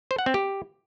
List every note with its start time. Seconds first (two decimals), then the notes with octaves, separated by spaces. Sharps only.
0.11 C5
0.19 F#5
0.26 C4
0.34 G4